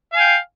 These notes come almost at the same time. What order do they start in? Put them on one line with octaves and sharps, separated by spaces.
F5 G#5 G5